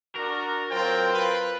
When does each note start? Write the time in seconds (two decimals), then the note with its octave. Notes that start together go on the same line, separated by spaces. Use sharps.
0.15 D4 F#4 A#4
0.71 F#3 C4 F4 C5 G5
1.13 F4 B4